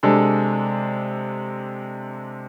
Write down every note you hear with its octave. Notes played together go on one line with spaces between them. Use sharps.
C3 G#3 D4 A4